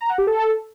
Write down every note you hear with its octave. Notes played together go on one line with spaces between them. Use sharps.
A#5
F#5
G4
A4